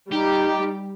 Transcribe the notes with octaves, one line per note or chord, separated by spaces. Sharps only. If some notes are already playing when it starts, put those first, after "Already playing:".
G3 D#4 G4